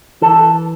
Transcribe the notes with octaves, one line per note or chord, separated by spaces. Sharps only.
E3 A4